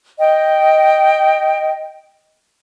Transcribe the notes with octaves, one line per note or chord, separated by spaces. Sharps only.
D#5 G5